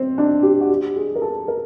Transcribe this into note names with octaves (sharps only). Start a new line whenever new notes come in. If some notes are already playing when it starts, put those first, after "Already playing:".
Already playing: C4
D4
G4
F#4
G4
G#4
A#4
A4
A#4